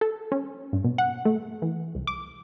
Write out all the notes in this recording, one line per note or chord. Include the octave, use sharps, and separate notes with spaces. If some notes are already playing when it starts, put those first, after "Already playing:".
A4
C#4
G2
B2
F#5
A3
E3
C2
D6